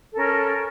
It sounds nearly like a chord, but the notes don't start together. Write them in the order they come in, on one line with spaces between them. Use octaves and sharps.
A4 A#4 C#4